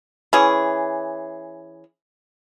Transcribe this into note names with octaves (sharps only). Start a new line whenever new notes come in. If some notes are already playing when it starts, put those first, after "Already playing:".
E3 C#4 G#4